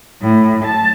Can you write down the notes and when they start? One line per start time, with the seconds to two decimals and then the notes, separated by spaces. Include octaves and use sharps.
0.21 A2
0.64 A5